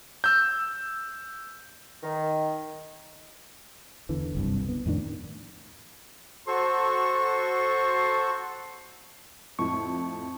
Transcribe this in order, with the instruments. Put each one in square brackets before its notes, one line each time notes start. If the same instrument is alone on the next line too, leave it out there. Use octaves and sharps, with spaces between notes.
[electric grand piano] E6 G6
[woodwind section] D#3
[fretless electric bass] E2 D3 E3
F#1 C2 G2
B3
F2 A2 D#3 D4
[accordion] F#4 A4 C#6 [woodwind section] C5 A5 C6
[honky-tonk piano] F2 A2 [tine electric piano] C#6